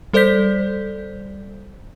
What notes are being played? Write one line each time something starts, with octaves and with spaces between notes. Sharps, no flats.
G3 A4 C5 D5 G6 B6